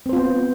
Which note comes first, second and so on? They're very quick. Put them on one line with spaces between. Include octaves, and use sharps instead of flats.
C4 C5 F4 B3